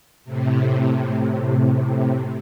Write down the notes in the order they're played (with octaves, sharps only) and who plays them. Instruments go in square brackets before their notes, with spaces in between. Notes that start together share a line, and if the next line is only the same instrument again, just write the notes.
[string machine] A2 C3